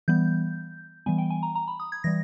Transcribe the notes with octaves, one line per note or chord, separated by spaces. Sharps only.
E3 G3 B3 G6
E3 G3 B3 G#5
G5
G#5
A#5
A#5
B5
D#6
G#6
E3 G3 A#6